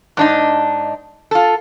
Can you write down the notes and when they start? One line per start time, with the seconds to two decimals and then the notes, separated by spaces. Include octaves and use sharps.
0.17 G#2 D4 D#4
1.31 F4 A4